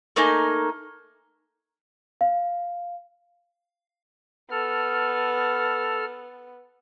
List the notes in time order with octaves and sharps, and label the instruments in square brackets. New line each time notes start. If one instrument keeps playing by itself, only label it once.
[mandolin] A3 A#3 D#4 G#5
[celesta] F5
[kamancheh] B3 [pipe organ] A4 F6